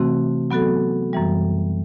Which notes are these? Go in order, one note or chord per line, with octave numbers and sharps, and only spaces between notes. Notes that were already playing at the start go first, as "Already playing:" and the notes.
Already playing: C3 E3 A3 C4 F#4
F#3 B3 F#4 A4
F#2 E3 G3